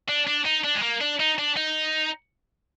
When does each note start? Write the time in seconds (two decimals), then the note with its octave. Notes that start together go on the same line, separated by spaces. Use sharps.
0.09 D4
0.27 D4
0.46 D#4
0.64 D4
0.75 G#3
0.83 A#3
1.01 D4
1.20 D#4
1.39 D4
1.57 D#4